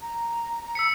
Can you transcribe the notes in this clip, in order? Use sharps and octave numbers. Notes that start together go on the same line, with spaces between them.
A#5
E6 B6 C#7